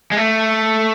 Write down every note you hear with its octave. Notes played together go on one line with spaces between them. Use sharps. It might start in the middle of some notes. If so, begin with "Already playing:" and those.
G#3
A3